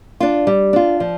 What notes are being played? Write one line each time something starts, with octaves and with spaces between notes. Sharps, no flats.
D4 F4
G3
D4 F4
F3